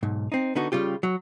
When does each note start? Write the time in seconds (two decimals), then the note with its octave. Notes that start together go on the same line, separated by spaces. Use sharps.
0.03 B1 G#2
0.32 C4 D#4
0.55 D3 B3 D#4 F#4
0.72 C#3 G3 F4 G4
1.03 F#3